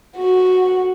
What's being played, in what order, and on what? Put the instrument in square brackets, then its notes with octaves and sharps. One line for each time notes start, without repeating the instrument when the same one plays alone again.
[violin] F#4